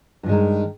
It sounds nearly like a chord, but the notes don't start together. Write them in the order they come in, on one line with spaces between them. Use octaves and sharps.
G2 F3 G#3 D#3